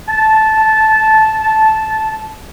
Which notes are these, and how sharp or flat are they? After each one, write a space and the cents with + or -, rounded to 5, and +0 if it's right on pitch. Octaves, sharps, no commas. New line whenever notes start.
A5 -10